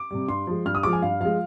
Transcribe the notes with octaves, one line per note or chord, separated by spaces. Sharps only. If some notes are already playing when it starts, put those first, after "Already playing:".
Already playing: D6
C3 G3
G2 C6
F3 G#3
G2 F6
D#6
F3 G#3 D6
G#5
G2 F5
F3 G#3 F5